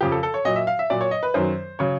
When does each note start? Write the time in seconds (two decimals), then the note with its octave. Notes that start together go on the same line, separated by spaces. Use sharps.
0.01 F2 C#3 F3 G4
0.12 A4
0.23 A4
0.34 C#5
0.45 A#2 F#3 D#5
0.56 E5
0.67 F5
0.79 E5
0.90 A#2 F#3 D5
1.01 C#5
1.11 D#5
1.23 B4
1.34 F#2 D#3 F#3 C5
1.79 C#3 F#3 C#5